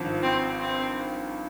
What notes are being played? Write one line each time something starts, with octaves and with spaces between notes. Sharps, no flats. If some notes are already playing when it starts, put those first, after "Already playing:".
Already playing: G#1 G2 F3
C4
C4